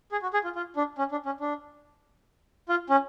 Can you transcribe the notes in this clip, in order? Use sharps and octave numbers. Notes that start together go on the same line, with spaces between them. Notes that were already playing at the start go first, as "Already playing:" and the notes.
G#4
F#4
G#4
F4
F4
D4
C#4
D4
C#4
D4
F4
C#4